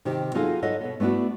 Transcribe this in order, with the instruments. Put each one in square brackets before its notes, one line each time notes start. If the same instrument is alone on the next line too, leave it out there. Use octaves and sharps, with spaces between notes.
[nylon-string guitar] C3 D#3 G4
F#3 D#4 F4 G#4 A4 F5
A4 B4 C#5 D#5 F#5
B2 B3
A3 B3 D4 E4 F#4